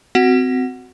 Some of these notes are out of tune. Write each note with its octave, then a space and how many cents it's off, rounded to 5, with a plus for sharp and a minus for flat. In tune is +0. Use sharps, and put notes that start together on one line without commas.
C4 -25 F#4 +0 F#5 +0